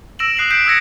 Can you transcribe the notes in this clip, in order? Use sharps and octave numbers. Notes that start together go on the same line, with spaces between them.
E6 A#6 D7 E7 F#7
D#6 F#6 C7 F7 F#7
F#6 G6 B6 C7 D7
D#6 E6 G#6 A#6 C#7